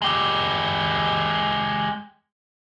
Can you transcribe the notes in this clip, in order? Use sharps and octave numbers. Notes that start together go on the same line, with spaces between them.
G#3 G4